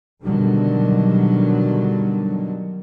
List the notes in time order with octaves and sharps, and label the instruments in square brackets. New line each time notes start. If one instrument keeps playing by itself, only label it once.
[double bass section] B2 D3 D#3 F#3 G3